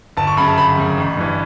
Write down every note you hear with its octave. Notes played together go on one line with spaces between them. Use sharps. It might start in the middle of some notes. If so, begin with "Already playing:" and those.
G1 A5
C#6
F#2 C#3 B5
A5
G1 B5
F#2 C#3
A1
G2 E3